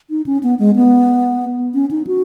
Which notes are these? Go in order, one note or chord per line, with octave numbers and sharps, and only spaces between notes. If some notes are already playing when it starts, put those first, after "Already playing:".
D#4
C#4
B3
G#3
B3
C#4
D#4
F#4